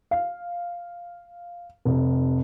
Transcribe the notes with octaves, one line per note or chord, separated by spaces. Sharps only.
F5
F1